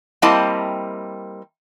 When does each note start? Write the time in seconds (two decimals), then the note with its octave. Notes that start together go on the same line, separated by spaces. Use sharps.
0.22 G3 A#3 C4 E4 D#5 A5